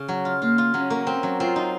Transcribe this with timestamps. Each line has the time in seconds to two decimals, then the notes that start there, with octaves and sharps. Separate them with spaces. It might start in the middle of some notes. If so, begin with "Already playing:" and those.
Already playing: C#3
0.08 F#3
0.25 F4
0.42 A#3 F4
0.58 F4
0.74 F#3 C#4
0.90 A#3
1.07 C4
1.23 F#3
1.40 C4 F4
1.56 D#4